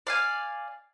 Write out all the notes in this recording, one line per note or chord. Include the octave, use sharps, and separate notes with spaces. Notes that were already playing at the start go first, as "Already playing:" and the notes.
D5 F5 G#5